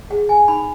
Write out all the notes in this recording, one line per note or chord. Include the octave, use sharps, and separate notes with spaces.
G#4 F#5
G#5
D#4 B5